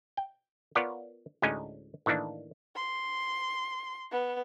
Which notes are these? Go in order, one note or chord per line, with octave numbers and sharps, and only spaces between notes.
G5
B3 F4 A#4 C#5 D5 F#5
D2 A2 G#3 C#4 D#4 G#5
A2 D#3 E3 A#3 D4
C6
B3